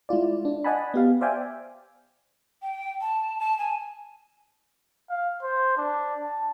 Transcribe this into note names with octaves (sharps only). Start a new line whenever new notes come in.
G#3 E4 F4 D5
D4
D5 D#5 F#5 G#5 A5 B5
B3 G4 F5
C5 D5 E5 F5 G5 G#5
G5
A5
A5
G#5
F5
C5
D4
A5